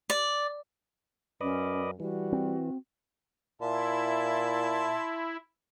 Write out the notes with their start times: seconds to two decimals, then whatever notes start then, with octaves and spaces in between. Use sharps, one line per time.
0.10 D5
1.41 F#2 C#4 B4 D5 D#5
2.00 E3 G3 F#4
2.32 C4
3.61 A#2 E4 E5 A5 C6